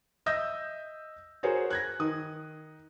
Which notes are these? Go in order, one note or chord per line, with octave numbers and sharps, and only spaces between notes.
D#5 E5 D#6 E6 G6 A#6
F#4 G#4 A#4 C5 C#5
F#6 G#6 A#6
D#3 D#6